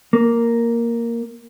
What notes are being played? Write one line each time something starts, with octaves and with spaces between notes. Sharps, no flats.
A#3